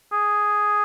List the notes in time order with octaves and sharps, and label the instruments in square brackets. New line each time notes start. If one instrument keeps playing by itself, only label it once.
[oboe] G#4